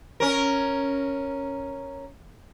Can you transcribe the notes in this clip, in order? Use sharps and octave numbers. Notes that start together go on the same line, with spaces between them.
C#4 A#4